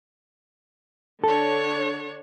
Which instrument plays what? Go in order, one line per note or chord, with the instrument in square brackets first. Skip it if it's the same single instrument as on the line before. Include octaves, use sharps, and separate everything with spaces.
[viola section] D3 D4 C#5 [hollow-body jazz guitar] A4